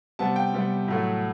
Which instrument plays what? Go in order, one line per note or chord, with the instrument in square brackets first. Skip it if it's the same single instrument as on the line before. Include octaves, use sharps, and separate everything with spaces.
[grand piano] C3 G3 B3 A5
G5
C3 G3 B3
A2 F#3 A3